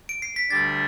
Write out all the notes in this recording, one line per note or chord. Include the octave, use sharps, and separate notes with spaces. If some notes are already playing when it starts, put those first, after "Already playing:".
D7
C7
B6
D2 D3 G3 D4 A6